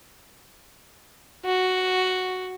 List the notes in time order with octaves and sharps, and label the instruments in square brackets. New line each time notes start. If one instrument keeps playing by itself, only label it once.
[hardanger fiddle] F#4